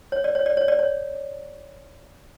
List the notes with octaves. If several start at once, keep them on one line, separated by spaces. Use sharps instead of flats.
C#5
D5
C#5
D5
C#5
D5
C#5